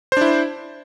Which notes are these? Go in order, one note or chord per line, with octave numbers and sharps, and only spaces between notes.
D4 E4 C5